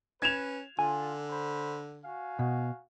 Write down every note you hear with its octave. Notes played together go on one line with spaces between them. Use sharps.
C#4 B4 G#6 E7 F7
D3 F4 G#5
C5 B5
F#4 F5 G#5
B2